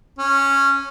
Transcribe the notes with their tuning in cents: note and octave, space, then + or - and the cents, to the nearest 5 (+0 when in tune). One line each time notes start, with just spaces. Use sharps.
C#4 -10